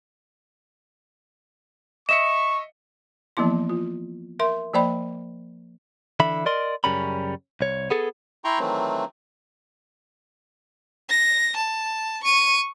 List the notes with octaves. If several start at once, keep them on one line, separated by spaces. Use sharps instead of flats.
D#5 E5 C#6 C#7 E7
E3 F3 A#3 B3 E4 C6
F4
A#4 E5 C6
F3 A#3 C5 D5 G5 B5
D3 E3 E5 B5
A#4 D5 D#5 C6
F#2 C#3 G3 C#4 A#4 B5
C2 C#5
B3 G#4 A4
E4 G5 A#5 C6 C#6
D#3 E3 F#3 A3 C4
A#6
A5
C#6 D#7